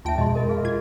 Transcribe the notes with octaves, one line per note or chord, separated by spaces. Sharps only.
D#2 F4 E5 G5 A5 D7
F2 B2 G#3 D#5 C6
A#4 D#5 B5
F#4 G#4 A#4 F5
F4 G#6